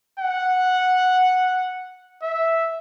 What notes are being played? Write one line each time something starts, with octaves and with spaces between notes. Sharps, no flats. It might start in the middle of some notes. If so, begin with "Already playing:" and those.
F#5
E5